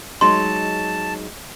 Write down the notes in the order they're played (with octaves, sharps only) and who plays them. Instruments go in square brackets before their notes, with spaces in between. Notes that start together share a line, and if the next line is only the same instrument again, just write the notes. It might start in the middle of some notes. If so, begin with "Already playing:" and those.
[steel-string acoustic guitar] F#3 G#3 D#4 [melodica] A5 [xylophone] C6